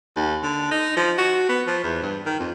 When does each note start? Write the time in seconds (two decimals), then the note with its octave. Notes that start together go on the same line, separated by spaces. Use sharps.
0.16 D#2
0.43 D3
0.71 D#4
0.96 F3
1.18 F#4
1.49 B3
1.67 F3
1.84 E2
2.02 G2
2.26 D#3
2.39 F2